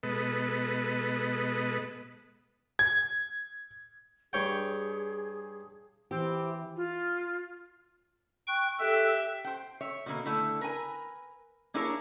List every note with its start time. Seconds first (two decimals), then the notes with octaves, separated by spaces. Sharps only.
0.03 B2 G#3 B3 A4 B4 D#5
2.79 G#6
4.33 G2 G#4 C#5 G5
6.11 E3 C4 G4
6.76 F4
8.47 G5 C#6 F#6
8.79 G4 A4 E5 F#6
9.44 C5 G5
9.81 C#5 E5
10.06 B2 D3 A#3
10.26 D3 A3 E4
10.61 A#4 B4 G#5
11.74 A#3 D4 E4 G#4 A#4 C#5